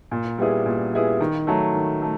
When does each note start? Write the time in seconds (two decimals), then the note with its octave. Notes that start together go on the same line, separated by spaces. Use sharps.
0.11 A#2
0.38 G3 B3 E4 G#4
0.66 A#2
0.93 G3 B3 E4 G#4
1.20 D#3
1.47 F#3 A3
1.74 D#3
2.02 A3